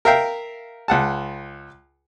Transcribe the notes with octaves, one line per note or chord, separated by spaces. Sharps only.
A#4 E5 F5 G5
C#2 F#5 A5